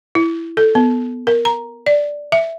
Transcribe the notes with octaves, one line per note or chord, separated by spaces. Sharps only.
E4
A4
B3
A#4
A#5
D5
E5